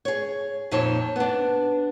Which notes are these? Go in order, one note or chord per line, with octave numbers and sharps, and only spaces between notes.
G#4 C#5
F2 A#2 D#4 C5 C#5 A5
B3 D4